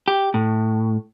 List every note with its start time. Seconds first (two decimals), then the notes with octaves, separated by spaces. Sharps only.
0.08 G4
0.34 A2